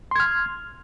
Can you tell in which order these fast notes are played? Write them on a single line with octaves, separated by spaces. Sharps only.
C6 G#6 F6